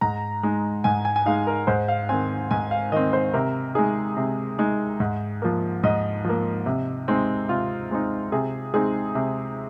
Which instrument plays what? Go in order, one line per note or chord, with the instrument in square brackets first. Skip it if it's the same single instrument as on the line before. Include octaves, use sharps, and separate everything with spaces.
[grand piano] G#2 A#5
G#3 D#4
G#2 G#5
G#5
G#5
G#3 D#4 F5
A#4
G#2 C5
F5
D#3 C4 G#5
G#2 G#5
F5
D#3 C4 D#5
C5
C3 A#4
G#3 D#4 G#4
C3
G#3 D#4
G#2
F3 A#3
G#2 D#5
F3 A#3
C3
G#3 C4 D#4
C3 F4
G#3 C4 D#4
C3 G#4
G#3 C4 D#4 G#4
C3